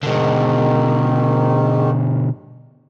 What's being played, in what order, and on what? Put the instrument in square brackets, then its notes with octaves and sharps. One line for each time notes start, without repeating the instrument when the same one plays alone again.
[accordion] G#2 D#3 [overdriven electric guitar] B2 D3